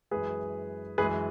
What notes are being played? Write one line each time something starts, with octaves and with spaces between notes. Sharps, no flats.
F#2 E3 G#3 G#4 B4
F#2 E3 G#3 G#4 B4